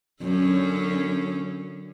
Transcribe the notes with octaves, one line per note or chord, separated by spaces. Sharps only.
F#2 D3 C#4